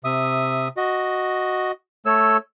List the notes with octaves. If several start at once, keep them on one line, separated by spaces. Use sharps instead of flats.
C3 E5 D#6
F#4 D#5
A3 A4 C#5 E6